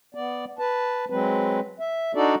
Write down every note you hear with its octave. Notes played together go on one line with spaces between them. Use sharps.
B3 D5
B4 A5
F#3 G#3 C4 B4
E5
D4 D#4 F#4 A4 D5